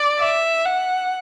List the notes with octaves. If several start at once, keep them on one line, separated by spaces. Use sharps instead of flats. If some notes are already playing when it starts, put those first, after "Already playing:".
Already playing: D5
E5
F#5